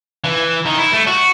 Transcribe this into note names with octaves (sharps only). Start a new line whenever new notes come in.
E3
D#3
E4
A3
F#4